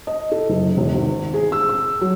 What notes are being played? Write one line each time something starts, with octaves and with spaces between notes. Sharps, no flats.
D#5
A4
F#1
E1
G#1
G#4
E6
E6
F#3